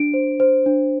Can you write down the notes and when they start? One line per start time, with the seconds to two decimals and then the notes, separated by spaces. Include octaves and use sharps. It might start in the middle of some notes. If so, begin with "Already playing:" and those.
Already playing: D4 D7
0.14 C5
0.40 C5
0.66 D4